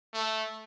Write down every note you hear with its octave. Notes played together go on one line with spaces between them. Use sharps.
A3